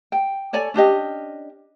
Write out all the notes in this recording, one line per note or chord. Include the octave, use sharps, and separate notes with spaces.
G5
A4 C#5 D5 G#5
C#4 D4 G4 D#5